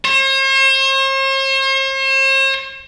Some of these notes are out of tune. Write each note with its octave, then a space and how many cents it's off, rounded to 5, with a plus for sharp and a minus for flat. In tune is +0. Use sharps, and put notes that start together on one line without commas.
C5 +45